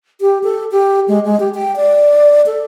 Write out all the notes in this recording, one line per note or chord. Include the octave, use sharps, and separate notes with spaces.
G4
A4
G4
G#3
G#3
G4
G5
D5
A4